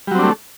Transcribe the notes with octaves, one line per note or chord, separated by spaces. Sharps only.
F#3 G3 A3 C4 D4